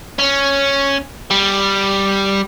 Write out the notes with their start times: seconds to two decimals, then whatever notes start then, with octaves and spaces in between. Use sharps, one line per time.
0.19 C#4
1.31 G3